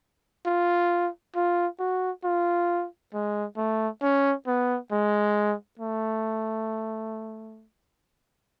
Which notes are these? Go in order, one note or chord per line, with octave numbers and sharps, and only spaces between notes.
F4
F4
F#4
F4
G#3
A3
C#4
B3
G#3
A3